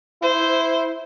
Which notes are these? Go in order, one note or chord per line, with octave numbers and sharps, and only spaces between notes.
E4 C5